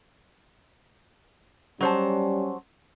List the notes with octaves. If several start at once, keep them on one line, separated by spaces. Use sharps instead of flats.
F#3 G3 C#4 C5 A5